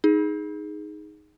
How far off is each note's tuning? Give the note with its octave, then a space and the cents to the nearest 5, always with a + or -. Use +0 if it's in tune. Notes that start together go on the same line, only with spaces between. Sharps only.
D#4 +0 G#4 +0